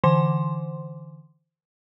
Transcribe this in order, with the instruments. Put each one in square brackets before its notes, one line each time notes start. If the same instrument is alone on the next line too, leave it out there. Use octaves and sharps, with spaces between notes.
[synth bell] D3 E3 C5 C6